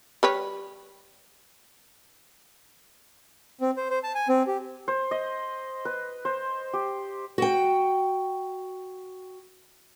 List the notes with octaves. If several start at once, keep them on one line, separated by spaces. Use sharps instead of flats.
G3 B4 C#5
C4
C5
C5
A5
G#5
C4
G4
C5
D#5
B4
C5
G4
F#4 G5